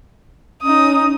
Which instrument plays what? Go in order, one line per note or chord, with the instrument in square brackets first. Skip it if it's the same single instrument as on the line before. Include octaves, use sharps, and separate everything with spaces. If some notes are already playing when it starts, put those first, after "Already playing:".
[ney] C#4 [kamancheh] D#4 D#6